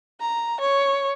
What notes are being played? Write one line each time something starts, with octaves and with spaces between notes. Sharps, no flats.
A#5
C#5